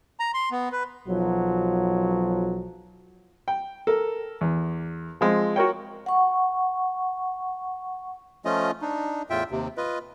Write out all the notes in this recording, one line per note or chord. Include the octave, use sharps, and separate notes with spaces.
A#5
C6
B3
B4
B1 F3 F#3
G5
A4 A#4
E2
F3 G#3 C4
F#4 A#4 C#5 G5
F#5 C#6
F3 A3 C#4 F4 D#5
D4 D#4
E2 A2 F4 E5 G5
D#2 C3
F4 B4 D#5